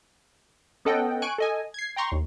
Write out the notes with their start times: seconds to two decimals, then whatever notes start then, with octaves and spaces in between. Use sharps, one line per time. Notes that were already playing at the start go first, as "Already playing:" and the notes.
0.85 B3 C#4 A4 D#5 F#5 G5
1.22 G#5 C#6 F#6 D7
1.38 A4 D#5 G#5
1.74 G#6 C7
1.96 G5 A#5 C6 C#6
2.12 D#2